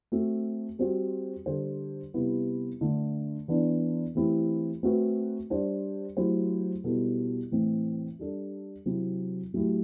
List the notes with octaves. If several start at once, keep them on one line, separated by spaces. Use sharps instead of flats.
A3 C4 F#4 A4
G3 C4 F#4 C5
D3 G3 D4 A4 C5
C3 G3 B3 E4
D3 A3 D4
E3 B3 D4
E3 A3 C4 E4 G4
A3 C4 F#4 B4
G3 D4 G4 C5
F#3 A3 E4 G4 C5
B2 G3 B3 E4 A4
A2 E3 A3 C4
G3 D4 A4
C3 F#3 C4 E4
A2 F#3 A3 E4 G4